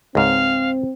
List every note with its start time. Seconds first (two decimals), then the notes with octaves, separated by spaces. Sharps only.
0.15 C#2 G#2 C4 F5